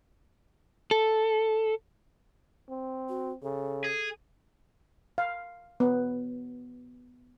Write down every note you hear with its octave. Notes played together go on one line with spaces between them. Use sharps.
A4
C4
F#4
C#3 A4
G#4
F5
B3